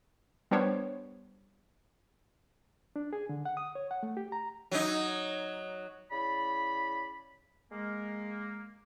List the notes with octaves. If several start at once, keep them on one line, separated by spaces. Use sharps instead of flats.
G3 B3 D4 C5 C#5
D4
G#4
D3
F#5
D#6
C#5
F#5
A3
G4
A#5
F#3 D#4
C#3 E4 D5 B5
G#3 A#3